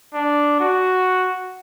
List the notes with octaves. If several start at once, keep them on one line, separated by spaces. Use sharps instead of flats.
D4
F#4